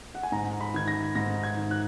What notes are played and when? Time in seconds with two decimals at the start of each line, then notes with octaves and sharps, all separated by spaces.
0.15 F#5
0.23 G#5
0.32 G#2 A#5
0.61 B5
0.74 D#3 G#6
0.88 A#6
1.15 G#2 A#6
1.43 G#6
1.57 D#3
1.71 F#6